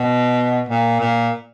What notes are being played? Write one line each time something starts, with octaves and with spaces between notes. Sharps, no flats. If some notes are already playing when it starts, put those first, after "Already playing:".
Already playing: B2
A#2
A#2